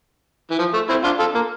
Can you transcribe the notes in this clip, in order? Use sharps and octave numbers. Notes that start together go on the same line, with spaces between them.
E3
F3
A3
C4 E4
D4 F4
F4 A4
A#3